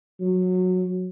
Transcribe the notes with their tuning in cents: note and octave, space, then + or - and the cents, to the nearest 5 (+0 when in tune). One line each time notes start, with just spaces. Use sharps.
F#3 -15